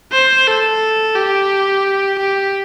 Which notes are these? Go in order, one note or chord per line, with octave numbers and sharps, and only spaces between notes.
C5
A4
G4
G4